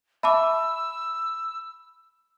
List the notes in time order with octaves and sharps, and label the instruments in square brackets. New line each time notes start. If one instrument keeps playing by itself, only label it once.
[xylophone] E5 A5 D6 [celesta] B5 [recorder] E6